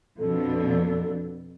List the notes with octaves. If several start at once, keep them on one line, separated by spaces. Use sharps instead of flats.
F2 B2 D4 A4